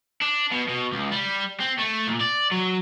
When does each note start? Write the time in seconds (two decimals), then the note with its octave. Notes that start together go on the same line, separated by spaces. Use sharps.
0.21 D4
0.52 B2
0.68 B2
0.92 C#2
1.12 G3
1.61 C4
1.79 A3
2.08 A#2
2.21 D5
2.52 F#3